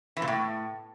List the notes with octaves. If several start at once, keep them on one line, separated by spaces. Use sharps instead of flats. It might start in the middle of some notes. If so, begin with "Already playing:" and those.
E3
A#2
A2